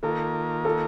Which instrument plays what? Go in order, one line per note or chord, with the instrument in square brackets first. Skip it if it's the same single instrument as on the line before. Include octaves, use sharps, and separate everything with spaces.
[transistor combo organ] D#3 A#3 F4 A#4 [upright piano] A4
[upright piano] A4